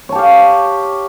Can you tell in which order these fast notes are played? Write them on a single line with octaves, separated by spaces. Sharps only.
C#5 A5 G4 F5